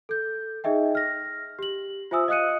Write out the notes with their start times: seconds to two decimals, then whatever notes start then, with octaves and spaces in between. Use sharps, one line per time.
0.09 A4 G6
0.64 D#4 G#4 D#5 E5 G5
0.95 F6 A#6
1.59 G4 F#7
2.11 F4 C5 E5 G#5 D#6 E6
2.28 D#5 F5 D#6 F#6 C#7 D#7